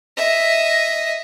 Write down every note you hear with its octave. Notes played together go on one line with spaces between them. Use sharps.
D#5 E5